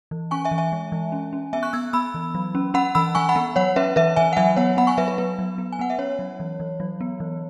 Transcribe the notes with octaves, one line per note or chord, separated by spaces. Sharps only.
E3
C#4 G#5 C#6
E5 G#5
E3
E5 G#5
G#3
E3
C#4
C#4
B3 E5 G#5
C#6 F#6
B3 E6 G#6
B3 B5 E6
E3
F#3
C#4
C#4 F#5 B5
E3 B5 E6
E3 G#5 C#6
F#5 B5
B3
F#3 C#5 F#5
C#4 B4 E5
E3 B4 E5
E3 E5 G#5
F#5
F#3 E5 G#5
B3 C#5 F#5
B3 F#5 B5
G#5 C#6
F#3 B4 E5
B4
B3 B4
F#3
B3
G#5
B3 F#5
E5
C#4 C#5
F#3
E3
E3
F#3
B3
E3